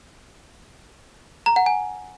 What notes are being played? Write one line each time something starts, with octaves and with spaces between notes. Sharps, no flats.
A#5
F#5
G#5